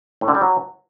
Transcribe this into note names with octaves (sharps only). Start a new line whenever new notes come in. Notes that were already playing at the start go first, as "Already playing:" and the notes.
A2
D3
G3
F#3